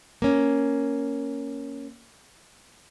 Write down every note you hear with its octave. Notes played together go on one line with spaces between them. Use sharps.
A#3 C#4